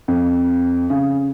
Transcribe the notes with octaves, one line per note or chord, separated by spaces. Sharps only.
F2
C#3